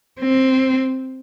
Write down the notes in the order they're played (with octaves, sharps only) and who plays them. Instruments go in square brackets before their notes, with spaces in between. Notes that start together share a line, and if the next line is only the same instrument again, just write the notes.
[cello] C4